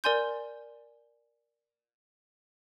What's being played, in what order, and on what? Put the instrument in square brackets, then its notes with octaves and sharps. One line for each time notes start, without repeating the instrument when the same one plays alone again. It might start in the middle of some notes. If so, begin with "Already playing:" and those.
[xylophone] A#4 D5 G#5 C6 G6